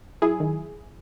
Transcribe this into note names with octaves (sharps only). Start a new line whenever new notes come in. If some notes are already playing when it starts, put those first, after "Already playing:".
F#3 E4 G#4
D#3